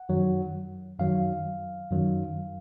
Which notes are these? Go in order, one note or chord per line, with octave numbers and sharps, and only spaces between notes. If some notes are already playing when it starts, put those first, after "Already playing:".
Already playing: F#5
F#2 D#3 F#3
F#2 D#3 F#3 F5
F#2 D#3 F#3